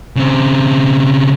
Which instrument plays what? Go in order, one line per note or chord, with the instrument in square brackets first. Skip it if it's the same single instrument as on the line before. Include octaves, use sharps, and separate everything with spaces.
[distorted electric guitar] C#3 C4